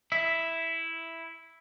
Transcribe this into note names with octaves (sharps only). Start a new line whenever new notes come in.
E4 E5